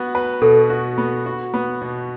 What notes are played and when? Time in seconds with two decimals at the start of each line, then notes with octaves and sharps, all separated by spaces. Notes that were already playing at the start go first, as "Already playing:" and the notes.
Already playing: B3 F#4
0.15 B4
0.41 B2 A4
0.70 F#4
0.98 B3
1.26 F#4
1.54 B3
1.82 B2